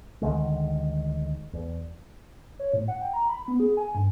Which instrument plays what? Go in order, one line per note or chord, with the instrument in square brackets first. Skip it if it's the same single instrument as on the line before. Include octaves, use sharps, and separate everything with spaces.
[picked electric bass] D2 D3 D#3 G#3
E2
[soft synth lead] C#5
A2
F#5
G5
A#5
B5
B3
G#4
G#5
G2